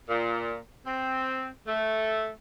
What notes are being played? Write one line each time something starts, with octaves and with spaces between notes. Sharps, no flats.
A#2
C4
A3